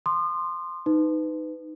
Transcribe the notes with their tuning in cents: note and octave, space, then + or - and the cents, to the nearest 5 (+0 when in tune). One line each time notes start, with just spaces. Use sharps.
C6 +0 D#6 -40
D#4 +0 B4 +25